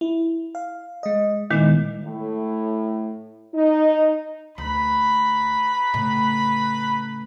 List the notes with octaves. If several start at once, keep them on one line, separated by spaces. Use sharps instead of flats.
E4
F5
G#3 D#5
A#2 D#3 G#3 B3 D#4 E4
A2
D#4
D2 B4 A#5 B5
A2 C#3